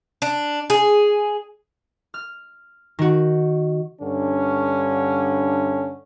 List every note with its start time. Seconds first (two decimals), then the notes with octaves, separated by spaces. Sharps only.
0.22 D4
0.70 G#4
2.14 F6
2.99 D#3 F#4
4.01 G2 D3 C#4